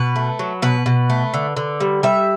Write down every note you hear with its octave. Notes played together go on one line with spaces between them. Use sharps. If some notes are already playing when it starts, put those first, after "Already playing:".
Already playing: B2 B4
A3
F#3
B2 B4
B2
A3
D3
D3
G3
G3 E5